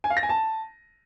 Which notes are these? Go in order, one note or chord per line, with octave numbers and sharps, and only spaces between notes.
G#5
F5
A#6
G#5
A5